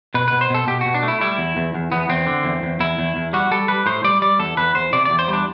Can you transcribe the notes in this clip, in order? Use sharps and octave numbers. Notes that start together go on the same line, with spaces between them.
B2 B4
B2 B4
C5
B2 A4
B2 G4
B2 F#4
D4
A3
E4
G3 E4
E2
E2
E2
E2 B3
E2 C4
D3
E2
E2
E2 E4
E2
E2
G3 F#4
G3 A4
G3 B4
A2 C5
G3 D5
G3 D5
E2 A4
E2 B4
E2 C5
C3 D5
E2 D5
C5
G3
D4